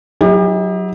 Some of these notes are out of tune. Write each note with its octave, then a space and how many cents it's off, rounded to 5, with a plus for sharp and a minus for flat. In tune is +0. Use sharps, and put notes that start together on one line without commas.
F#3 +0 D#4 +45 G4 +40